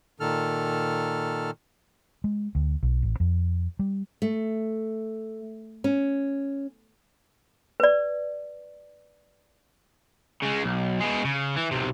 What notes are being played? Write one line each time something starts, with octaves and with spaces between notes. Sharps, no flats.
A#2 D#3 A4 F6
G#3
D2
B1
A1
F2
G3
A3
C#4
B4 D5
C#3 G#3
B1
B2 G#3
C#3
E3
B1 C3